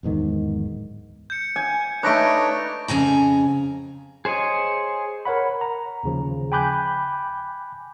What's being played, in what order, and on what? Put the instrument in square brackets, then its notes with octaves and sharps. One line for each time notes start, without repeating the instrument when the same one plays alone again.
[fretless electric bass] D1 E2 G#2 D#3
[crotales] G6 C#7
[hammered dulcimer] G#5
[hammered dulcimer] A3 B4 [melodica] D4 D#4 C#5 [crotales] D6 A#6 D7
[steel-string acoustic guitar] F2 C#3 G#5 A#5
[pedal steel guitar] G#4 C5 C#5 D#5
[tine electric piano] A#4 C#5 F#5 B5
A#5
D#2 C#3 F3
G5 G#5 B5 D6 F#6 G6